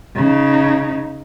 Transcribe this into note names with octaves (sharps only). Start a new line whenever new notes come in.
C#3 D#4